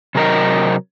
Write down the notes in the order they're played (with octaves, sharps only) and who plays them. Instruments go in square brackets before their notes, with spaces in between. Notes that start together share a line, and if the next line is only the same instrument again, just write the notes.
[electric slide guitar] C3 F#3 A#4 D#5